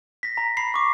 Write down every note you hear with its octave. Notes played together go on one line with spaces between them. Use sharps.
A#6 B6
A#5
A#5 B5 C7
C#6 D6